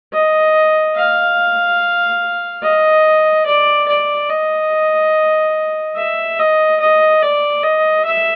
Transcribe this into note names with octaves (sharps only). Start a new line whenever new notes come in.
D#5
F5
D#5
D5
D5
D#5
E5
D#5
D#5
D5
D#5
E5